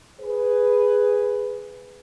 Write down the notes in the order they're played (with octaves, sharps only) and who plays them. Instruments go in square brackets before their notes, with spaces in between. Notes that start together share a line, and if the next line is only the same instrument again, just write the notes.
[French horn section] G#4 B4